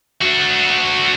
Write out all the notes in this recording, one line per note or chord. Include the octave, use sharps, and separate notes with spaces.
D4 F#4